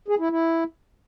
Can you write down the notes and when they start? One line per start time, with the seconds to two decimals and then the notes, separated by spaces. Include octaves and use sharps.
0.08 G#4
0.19 E4
0.30 E4